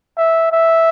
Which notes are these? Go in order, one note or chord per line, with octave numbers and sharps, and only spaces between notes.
E5
E5